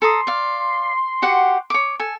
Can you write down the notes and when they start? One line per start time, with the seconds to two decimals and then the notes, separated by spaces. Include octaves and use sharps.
0.02 A4 A#5 C6 D#6
0.27 D5 F5
1.22 F#4 G4 F#5
1.70 C#5 D6
2.00 A4 G#5